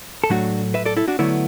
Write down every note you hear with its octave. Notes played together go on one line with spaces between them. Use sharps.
A4
A2 F#3 A3 D4 F#4
B4 E5
A4 D5
E4 A4
D4 F#4
D3 F#3 A3 B3 E4